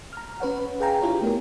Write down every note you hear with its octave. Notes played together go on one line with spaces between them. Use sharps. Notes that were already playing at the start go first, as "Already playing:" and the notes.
A#5 F6
C#4 B4 C#5 F#5
G#4 B4 F5 G5 G#5 A#5
D4 E4 F4 G4 C#5
A3 B3 A#4